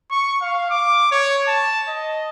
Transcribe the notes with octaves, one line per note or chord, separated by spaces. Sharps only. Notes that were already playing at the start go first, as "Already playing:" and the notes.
C#6
F5
D6
C#5
A5
D#5